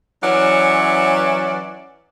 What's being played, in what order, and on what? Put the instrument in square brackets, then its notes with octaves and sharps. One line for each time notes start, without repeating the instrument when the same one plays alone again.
[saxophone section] E3 F#3 C#4 D5 E5 F#5